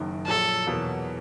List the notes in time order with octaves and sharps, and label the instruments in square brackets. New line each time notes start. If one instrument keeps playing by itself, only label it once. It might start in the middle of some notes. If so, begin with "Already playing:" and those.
Already playing: [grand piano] F#1 F#2 D#3
[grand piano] A#1 A#2 F#3 [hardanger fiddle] A4
[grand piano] E2 B2 F#3 A#3